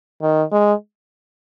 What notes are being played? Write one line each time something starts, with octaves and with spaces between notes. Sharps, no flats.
D#3
G#3